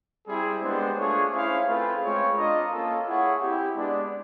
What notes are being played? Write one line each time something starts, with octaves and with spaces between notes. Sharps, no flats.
G3 C4 E4 G#4 C5
G#3 B3 D4 G4 C5
A3 D4 F4 G#4 C#5
C#4 E4 G#4 C5 F5
A3 C4 F4 G#4 B4
G#3 C4 F4 G#4 C#5
D4 F4 A#4 D#5
A#3 C#4 F4 A4
E4 G#4 C#5 F#5
C4 E4 G4
G#3 B3 D4